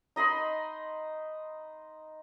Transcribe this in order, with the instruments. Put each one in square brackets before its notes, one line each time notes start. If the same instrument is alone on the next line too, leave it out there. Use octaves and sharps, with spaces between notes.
[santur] D#4 D#5 B5 C6